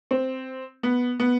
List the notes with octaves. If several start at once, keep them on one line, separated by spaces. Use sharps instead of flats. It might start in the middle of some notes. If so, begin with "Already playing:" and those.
C4
B3
B3